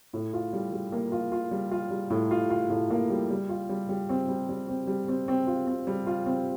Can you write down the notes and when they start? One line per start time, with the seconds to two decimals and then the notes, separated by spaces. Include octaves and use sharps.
0.13 A2
0.33 F4
0.53 G3
0.72 G3
0.92 A#3
1.12 F4
1.32 F4
1.51 G3
1.71 F4
1.91 G3
2.10 A2
2.31 F4
2.50 F4
2.70 A2
2.90 A#3
3.10 G3
3.30 G3
3.49 F4
3.70 G3
3.89 G3
4.09 C4
4.28 G3
4.49 G3
4.68 C4
4.87 G3
5.08 C4
5.28 C4
5.47 F4
5.67 C4
5.87 G3
6.07 F4
6.26 C4